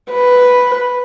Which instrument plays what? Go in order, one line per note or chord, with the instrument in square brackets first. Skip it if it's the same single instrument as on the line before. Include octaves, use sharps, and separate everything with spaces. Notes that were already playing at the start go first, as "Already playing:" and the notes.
[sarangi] B4